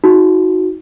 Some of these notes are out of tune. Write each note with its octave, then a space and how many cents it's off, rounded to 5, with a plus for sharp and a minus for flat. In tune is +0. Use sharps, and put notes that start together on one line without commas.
D#4 +30 F#4 -10